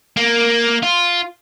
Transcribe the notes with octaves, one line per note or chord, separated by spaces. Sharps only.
A#3
F4